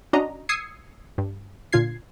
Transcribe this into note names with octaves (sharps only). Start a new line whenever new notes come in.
C#4 D4 F#4 D#5 A#5
D#6 E6 G#6 C7 C#7
G2
A#2 D3 F4 G#6 C7